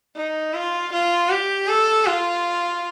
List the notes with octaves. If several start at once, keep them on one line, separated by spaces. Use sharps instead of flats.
D#4
F4
F4
G4
A4
F4